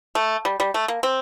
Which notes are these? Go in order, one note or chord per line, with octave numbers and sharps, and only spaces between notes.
A3
G3
G3
A3
A#3
C4